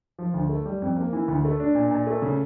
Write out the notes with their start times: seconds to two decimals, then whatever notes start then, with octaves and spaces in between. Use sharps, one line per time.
0.19 F3
0.34 D2
0.49 A3
0.66 G3
0.82 F2
0.97 A#3
1.13 E3
1.28 D2
1.45 A3
1.60 D4
1.75 A#2
1.91 A#2
2.07 A3
2.22 C#3